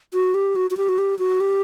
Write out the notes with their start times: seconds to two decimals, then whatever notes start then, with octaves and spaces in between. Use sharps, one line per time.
0.14 F#4
0.34 G4
0.56 F#4
0.71 F#4
0.77 G4
0.89 F#4
0.98 G4
1.19 F#4
1.40 G4